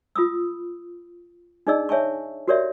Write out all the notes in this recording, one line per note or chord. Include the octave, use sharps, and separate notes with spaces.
F4 B5 D#6 E6
D4 D#4 G#4 D5 D#5 E6
C#5 E5 G#5 A5 C#6
F#4 G4 A#4 C#5 D5 E5